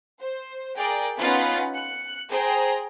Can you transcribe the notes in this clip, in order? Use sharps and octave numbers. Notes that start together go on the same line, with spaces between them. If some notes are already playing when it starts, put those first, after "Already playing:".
C5
G#4 A#4 D5 G5
B3 C#4 D#4 F4 B4 F#5
F#6 C#7
G#4 C5 G5 A#5